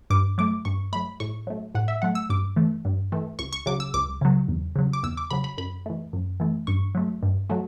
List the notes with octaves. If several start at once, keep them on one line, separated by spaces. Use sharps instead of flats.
G2 D6
F#3 A3 D6
G2 C#6
F#3 A3 B5
A2 C#6
F#3 A3
A2 F#5
E5
F#3 A3 F#5
E6
G2 D6
E3 A3
G2
E3 A3
C#2 C#6
C#6
C#3 F#3 D6
E6
C#2 D6
C#3 F#3
E2
C#3 F#3
D6
E2 E6
D6
C#3 F#3 B5
B5
F#2 B5
E3 A3
F#2
E3 A3
G2 C#6
F#3 A3
G2
F#3 A3